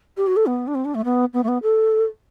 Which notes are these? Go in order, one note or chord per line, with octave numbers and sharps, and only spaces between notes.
G4
F#4
A4
B3
D4
C4
D4
A3
B3
B3
A3
B3
A4